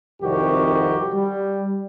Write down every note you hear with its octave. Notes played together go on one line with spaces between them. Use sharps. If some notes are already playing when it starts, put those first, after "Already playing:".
C2 F2 D#3 F#4 G4
G3